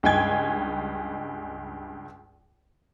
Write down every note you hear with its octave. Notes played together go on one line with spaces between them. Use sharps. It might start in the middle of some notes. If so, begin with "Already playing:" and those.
C#2 G2 D#4 G5 G#5 G#6